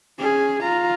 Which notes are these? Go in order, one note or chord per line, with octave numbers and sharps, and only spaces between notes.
C#4 G#4
F4 A#5